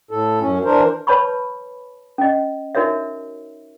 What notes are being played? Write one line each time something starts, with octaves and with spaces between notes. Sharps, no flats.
A2 A4
F#2 C#4
E3 D4 A#4 C5
B4 C#5 A5 B5 C#6
C#4 D#5
D#4 F#4 A#4 C#5 E5